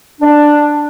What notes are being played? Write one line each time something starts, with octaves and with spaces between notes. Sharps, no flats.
D4